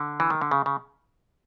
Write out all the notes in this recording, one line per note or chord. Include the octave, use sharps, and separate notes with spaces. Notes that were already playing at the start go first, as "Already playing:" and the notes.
Already playing: D3
E3
D#3
D3
C#3
C#3